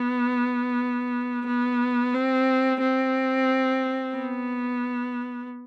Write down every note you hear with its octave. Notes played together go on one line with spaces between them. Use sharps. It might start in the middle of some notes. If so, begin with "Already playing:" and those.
Already playing: B3
B3
C4
C4
B3